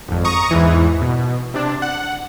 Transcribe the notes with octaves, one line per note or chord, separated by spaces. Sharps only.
G#1 F2
A#5 C#6 D#6
E2 G#2 E3
B2
C3 D4
F#5